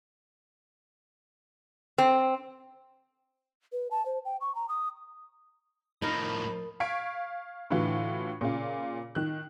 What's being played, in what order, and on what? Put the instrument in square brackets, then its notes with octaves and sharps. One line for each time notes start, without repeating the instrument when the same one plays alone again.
[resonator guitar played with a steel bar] C4
[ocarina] B4
A5
C5
G5
C#6
A#5
D#6
[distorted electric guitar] A2 F3 [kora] D#4 A#4 [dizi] B5
[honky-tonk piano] F5 C#6 G#6 B6 D7
A2 D3 E3 F4 F#4
A#2 C#3 F4
D#3 F#6